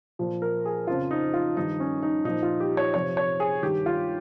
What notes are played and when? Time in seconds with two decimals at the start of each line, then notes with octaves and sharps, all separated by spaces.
0.19 A#2 F3
0.42 A#4
0.65 G#4
0.87 F2 C#3 F3 F4
1.11 D#4
1.34 F4
1.57 G2 D#3 D#4
1.80 C#4
2.02 D#4
2.25 A#2 F3 D#4
2.43 F4
2.60 G4
2.77 C#5
2.94 F2 C3 F3 C#5
3.17 C#5
3.40 G#4
3.63 G2 D#3 G4
3.86 F4